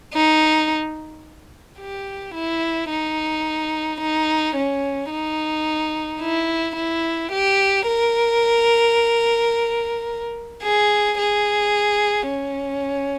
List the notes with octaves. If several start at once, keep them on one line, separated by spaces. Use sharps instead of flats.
D#4
G4
E4
D#4
D#4
C#4
D#4
E4
E4
G4
A#4
G#4
G#4
C#4